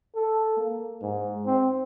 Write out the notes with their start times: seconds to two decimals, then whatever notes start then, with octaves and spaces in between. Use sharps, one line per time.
0.16 A4
0.57 A#3
1.02 G#2
1.46 C4